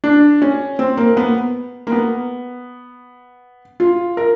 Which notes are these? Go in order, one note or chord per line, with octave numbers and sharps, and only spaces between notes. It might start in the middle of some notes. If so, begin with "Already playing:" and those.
D4
C#4
C4
A#3
B3
A#3
B3
F4
A#4